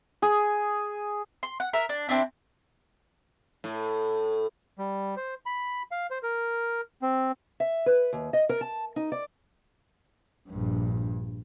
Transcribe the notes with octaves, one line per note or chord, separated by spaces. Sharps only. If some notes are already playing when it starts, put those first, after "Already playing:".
G#4
C6
F#5
A#4 E5
D4
C4 D4 E4
A2
G3
C5
B5
F5
C5
A#4
C4
E5
B4
D#2
D#5
A#4
A5
D#4
D5
A#1 G2